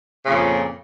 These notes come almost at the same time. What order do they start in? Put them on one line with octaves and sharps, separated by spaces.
C#3 A#2 F2